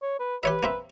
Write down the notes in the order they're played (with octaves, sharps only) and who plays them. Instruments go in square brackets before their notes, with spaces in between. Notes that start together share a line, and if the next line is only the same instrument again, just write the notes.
[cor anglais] C#5
B4
[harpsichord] G4 C#5 E5 [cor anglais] B4
[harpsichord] A#3 C4 E5